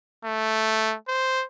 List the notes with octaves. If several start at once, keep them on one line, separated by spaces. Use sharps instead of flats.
A3
C5